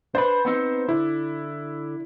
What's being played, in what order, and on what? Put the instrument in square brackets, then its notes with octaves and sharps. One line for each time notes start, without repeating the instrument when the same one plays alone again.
[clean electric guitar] D4 B4 [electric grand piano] C5
[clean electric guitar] B3 C4 D#4
[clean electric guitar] D3 [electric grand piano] E4